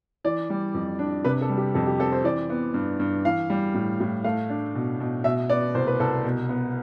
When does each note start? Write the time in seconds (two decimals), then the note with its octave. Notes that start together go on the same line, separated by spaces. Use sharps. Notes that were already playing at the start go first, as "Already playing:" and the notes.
0.24 E3 D5
0.50 G3
0.74 F2
0.99 D4
1.25 C3 B4
1.41 A4
1.49 G3
1.57 G4
1.74 F2 A4
1.87 G4
1.99 C4 A4
2.12 C5
2.24 E3 D5
2.50 B3
2.74 G2
3.00 G2
3.25 E3 F5
3.50 G3
3.74 A2
4.00 A2
4.24 A3 F5
4.50 D4
4.75 B2
5.00 B2
5.24 B2 E5
5.49 B3 D5
5.75 C2 C5
5.87 B4
6.00 C2 A4
6.24 B2
6.49 B3